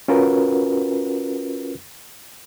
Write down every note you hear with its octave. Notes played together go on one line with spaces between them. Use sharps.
C#4 F4 F#4 A#4 B4